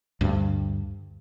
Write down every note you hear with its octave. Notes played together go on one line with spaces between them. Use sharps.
D2 G2